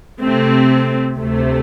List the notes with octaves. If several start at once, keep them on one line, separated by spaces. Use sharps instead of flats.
C3 A3 C4
D2 C3 A3